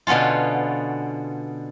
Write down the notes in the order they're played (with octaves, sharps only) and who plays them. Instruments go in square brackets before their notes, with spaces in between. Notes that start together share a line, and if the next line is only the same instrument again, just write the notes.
[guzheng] B2 D3 B3 C#4 F4